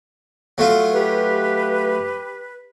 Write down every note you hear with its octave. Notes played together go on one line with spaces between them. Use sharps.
F#3 A3 F4
G4 B4